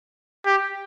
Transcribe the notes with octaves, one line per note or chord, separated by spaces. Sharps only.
G4